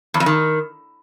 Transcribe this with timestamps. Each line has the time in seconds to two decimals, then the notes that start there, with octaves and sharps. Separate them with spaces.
0.14 E2
0.20 F2
0.26 D#3